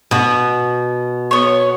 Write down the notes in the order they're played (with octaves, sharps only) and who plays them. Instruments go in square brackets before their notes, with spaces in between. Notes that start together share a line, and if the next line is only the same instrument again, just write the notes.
[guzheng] B2 F#4
[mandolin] B3 C#5